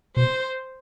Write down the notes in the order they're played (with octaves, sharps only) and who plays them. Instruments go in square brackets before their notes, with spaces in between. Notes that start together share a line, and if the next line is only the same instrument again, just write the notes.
[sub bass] B2 [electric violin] C5